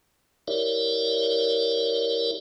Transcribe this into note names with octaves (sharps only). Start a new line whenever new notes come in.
E4 G4 A#4 C#5 D5 E5